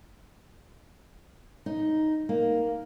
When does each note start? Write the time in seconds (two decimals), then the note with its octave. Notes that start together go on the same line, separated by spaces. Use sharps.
1.66 D#4
2.29 A#3